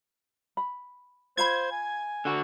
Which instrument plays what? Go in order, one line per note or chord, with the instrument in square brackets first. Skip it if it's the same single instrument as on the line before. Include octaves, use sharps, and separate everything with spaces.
[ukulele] B5
[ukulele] F4 F5 B5 [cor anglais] C5 [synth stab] G#6
[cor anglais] G#5
[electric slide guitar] D3 F#4